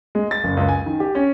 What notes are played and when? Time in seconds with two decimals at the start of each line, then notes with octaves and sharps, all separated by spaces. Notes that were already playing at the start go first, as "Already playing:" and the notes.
0.15 G#3
0.31 A6
0.44 F#1
0.57 C#2
0.69 G#5
0.86 D#3
1.00 G4
1.15 C#4